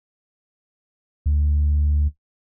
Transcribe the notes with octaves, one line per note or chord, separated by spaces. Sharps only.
D2